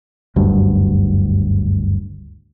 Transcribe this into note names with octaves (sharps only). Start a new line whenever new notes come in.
F#1 D2 G2